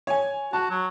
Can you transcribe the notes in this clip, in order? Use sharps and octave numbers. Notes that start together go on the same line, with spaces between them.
C#5 G#5
F#4 A5
F#3